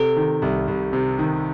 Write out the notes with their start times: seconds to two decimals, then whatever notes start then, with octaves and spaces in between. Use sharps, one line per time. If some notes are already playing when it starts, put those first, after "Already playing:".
Already playing: C3 A4
0.17 D#3
0.42 C2
0.68 C2
0.93 C3
1.19 D#3